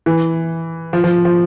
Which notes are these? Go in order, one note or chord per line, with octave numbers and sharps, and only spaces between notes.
E3
F3
F3
F3